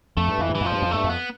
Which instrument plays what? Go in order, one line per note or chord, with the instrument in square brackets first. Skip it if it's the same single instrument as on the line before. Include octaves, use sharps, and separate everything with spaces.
[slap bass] F2 [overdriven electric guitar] A3
[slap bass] G2
[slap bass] F2 [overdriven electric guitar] E3
[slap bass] G2
[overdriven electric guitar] E3
[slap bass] F2 [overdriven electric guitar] F3
[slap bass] G2
F2
[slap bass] G2 [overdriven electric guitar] A3
[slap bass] F2
[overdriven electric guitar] B3